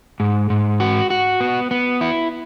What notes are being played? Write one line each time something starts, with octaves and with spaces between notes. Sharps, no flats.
G#2
G#2
F#4
F#4
B3
B3
E4